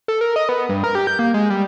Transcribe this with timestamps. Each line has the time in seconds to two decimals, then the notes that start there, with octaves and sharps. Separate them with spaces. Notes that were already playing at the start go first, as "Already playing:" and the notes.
0.08 A4
0.21 A#4
0.36 D#5
0.49 B3
0.69 G2
0.84 A#4
0.95 G4
1.07 G6
1.19 A#3
1.34 G#3
1.50 G3